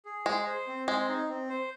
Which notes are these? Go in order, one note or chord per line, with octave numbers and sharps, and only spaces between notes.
G#4
G#3 C5
C5
C4
G#3 C5
D#4
C4
C5